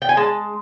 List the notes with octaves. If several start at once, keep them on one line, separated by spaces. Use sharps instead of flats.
G5
G#5
G#3 A5